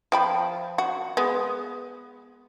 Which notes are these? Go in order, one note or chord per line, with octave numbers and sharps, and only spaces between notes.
F3 G5 B5
F#4
G#3 B3